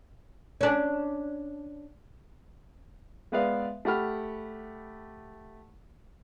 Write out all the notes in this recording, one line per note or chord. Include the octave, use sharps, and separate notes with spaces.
C#4 D4
G#3 B3 B4 D5 E5 F5
A3 G4 F#5 B5 F6